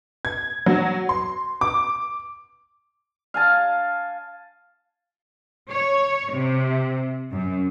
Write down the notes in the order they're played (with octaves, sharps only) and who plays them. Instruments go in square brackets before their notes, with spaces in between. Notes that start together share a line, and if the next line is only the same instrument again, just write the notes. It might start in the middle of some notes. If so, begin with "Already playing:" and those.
[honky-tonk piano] G#6
F#3
C6
D6
[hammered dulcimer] F5 G#5 A5
[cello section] C#5
C3
F#2